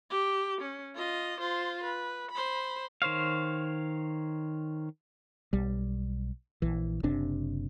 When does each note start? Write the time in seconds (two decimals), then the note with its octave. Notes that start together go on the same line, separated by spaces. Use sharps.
0.10 G4
0.61 C#4
0.95 F4 D#5
1.40 F4 C5
1.84 B4
2.31 C5 B5
3.02 D#3 C5 C#5 F5
5.53 B1 G3
6.62 A#1 E3
7.03 F#1 C3 D4